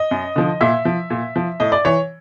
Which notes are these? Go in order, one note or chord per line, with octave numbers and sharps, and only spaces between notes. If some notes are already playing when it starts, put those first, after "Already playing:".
Already playing: D#5
F#2
D3 F3
A#2 E5
F3
A#2
F3
A2 D#5
D5
E3 C#5